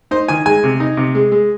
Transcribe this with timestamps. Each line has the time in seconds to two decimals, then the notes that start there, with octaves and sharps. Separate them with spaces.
0.11 D#4 C5
0.28 D#3 G#5
0.46 G#3 G#5
0.64 C3
0.80 D#4
0.97 C3
1.15 G#3
1.32 G#3